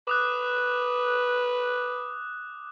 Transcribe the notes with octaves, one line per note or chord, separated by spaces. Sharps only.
B4 D6 D#6 F#6